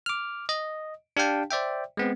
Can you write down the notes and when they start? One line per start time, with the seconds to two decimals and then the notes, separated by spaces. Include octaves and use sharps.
0.06 D6 F6
0.49 D#5
1.17 D4 G4 F5 G5 A5
1.51 C5 D5 E5 G5
1.97 G#3 B3 C4